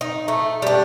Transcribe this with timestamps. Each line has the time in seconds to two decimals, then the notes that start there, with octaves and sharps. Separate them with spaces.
0.01 D#4
0.28 A3
0.62 G3 D4